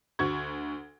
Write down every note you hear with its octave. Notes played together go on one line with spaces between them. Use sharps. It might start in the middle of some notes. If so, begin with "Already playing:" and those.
D2 F#4 C#6 G#6